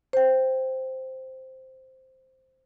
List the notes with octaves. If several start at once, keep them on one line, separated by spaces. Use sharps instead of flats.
C5 G5